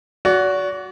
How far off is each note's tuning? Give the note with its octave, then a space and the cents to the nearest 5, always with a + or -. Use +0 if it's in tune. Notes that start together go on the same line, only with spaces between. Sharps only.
F#4 +0 D5 -40